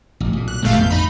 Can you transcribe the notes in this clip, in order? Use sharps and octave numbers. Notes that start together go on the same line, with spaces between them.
A1 G2
B1 A#2
F#6
G1 A#2 G#3 A3 F5
A1 F2 B3 G6
D#4 B5